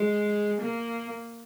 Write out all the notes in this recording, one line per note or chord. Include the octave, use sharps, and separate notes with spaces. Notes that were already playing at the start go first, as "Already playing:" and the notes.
Already playing: G#3
A#3